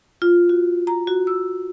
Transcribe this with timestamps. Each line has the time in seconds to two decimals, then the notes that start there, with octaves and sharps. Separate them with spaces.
0.22 F4
0.49 F#4
0.87 A#5
1.07 F#4
1.27 E6